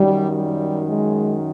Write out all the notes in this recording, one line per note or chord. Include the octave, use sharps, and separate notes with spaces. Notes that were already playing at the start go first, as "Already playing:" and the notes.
Already playing: F#2 D#3 G3
G3
G#3